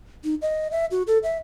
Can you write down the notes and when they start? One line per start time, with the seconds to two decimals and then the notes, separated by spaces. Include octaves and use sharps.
0.24 D#4
0.42 D#5
0.71 E5
0.91 F#4
1.07 A4
1.23 E5